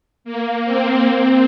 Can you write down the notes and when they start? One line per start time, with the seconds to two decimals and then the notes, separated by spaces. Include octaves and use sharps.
0.24 A#3
0.65 C4
1.05 C4